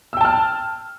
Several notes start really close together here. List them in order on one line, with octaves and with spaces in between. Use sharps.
E6 G5 A5 F6